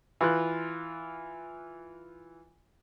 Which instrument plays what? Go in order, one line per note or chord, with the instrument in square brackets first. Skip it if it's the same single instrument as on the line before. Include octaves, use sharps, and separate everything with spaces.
[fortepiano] E3 F4 F#6